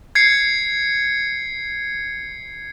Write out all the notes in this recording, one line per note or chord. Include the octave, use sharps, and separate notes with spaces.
G#6 C7 C#7